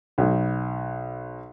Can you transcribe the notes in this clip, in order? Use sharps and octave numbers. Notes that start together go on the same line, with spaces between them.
B1